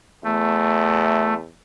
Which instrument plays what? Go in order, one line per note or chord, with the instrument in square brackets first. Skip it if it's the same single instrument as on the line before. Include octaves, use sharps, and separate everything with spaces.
[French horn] E2 [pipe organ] A3